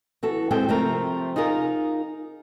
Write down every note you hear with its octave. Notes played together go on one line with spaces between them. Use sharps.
E3 F#4 A4
G#3 C4 E4 A4 G5
C3 F3 A3 C4 A#4
D#4 F4 G#4 A#4 F5